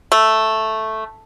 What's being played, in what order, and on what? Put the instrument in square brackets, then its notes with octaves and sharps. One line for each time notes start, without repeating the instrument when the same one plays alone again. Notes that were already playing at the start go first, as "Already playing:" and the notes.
[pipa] A3